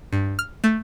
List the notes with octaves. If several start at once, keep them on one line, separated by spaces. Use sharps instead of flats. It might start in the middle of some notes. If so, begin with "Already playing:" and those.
G2
F6
A3